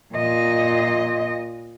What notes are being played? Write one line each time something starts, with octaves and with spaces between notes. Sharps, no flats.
A#2 D#5